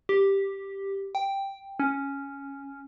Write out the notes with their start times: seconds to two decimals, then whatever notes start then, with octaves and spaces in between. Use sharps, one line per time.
0.09 G4
1.15 G5
1.80 C#4